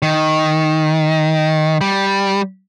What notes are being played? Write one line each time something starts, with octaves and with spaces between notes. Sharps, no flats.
D#3
G3